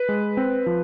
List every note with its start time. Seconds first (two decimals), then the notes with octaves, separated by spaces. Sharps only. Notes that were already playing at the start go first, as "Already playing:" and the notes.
Already playing: B4
0.09 G#3
0.37 C4
0.66 F3